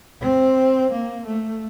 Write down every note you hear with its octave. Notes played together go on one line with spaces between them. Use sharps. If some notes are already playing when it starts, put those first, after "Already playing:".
C4
A#3
A3